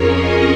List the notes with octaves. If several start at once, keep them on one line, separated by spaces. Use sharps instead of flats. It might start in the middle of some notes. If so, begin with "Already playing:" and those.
Already playing: F2 F3 C#4 G#4 A#4 C#5
D#5